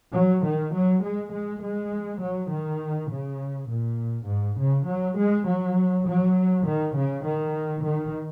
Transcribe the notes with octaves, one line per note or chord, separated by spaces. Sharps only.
F#3
D#3
F#3
G#3
G#3
G#3
F#3
D#3
C#3
A#2
G#2
C#3
F#3
G#3
F#3
F#3
D#3
C#3
D#3
D#3